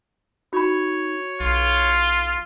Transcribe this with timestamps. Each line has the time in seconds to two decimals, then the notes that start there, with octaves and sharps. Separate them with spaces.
0.53 D#4 F#4 C#5 B5
1.40 B1 F4